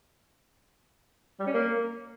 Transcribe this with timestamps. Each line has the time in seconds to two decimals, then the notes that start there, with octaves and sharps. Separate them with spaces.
1.40 G3
1.47 C#4
1.54 A#3